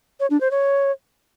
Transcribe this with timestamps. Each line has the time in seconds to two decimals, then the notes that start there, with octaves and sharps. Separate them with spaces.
0.20 C#5
0.30 D4
0.41 C5
0.51 C#5